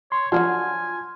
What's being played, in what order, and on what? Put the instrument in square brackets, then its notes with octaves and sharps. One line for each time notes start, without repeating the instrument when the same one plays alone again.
[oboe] C#5 [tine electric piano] C6
[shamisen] D3 F#3 F#4 [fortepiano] F3 [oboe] G#5 [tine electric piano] C6 F6